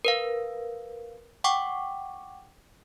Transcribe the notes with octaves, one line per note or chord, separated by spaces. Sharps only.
A#4 B4 F5
F#5 G5 C#6 D6